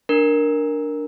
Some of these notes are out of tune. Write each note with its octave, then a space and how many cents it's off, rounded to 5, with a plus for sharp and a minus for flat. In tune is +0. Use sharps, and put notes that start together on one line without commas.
D4 +0 A#4 +0